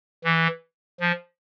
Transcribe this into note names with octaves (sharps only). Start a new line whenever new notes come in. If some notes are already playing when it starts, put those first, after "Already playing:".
E3
F3